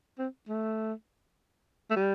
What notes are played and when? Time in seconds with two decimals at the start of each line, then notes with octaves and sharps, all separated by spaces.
0.19 C4
0.49 A3
1.91 A3
1.96 G3